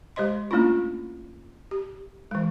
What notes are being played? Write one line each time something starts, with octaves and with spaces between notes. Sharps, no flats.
G#3 G4 C5 D#5 C6
A3 A#3 C#4 D4 E4 F4
G4
E3 G#3